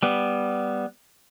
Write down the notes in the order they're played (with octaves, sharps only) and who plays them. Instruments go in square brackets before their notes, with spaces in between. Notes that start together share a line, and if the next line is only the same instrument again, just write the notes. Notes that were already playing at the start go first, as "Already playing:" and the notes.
[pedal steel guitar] G3 B3